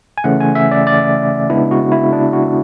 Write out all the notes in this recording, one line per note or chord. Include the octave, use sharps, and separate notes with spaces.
G#5
C#3 E3 A3 C#4 F#5
G#5
E5
D5
D5
C#3 G#3 B3 D4 E4
F#4
E4
D4
F#4